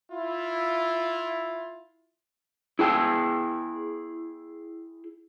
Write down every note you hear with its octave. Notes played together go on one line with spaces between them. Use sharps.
E4 F4
E4 G#4 G5